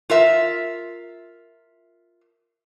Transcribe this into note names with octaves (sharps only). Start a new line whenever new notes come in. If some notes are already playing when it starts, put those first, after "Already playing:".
F4 A#4 E5